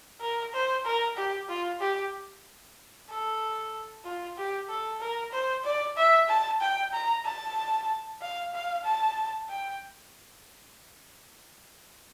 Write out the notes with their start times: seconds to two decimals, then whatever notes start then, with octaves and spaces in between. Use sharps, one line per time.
0.20 A#4
0.53 C5
0.85 A#4
1.16 G4
1.49 F4
1.81 G4
3.09 A4
4.05 F4
4.37 G4
4.69 A4
5.00 A#4
5.32 C5
5.64 D5
5.97 E5
6.29 A5
6.61 G5
6.93 A#5
7.25 A5
8.21 F5
8.53 F5
8.84 A5
9.49 G5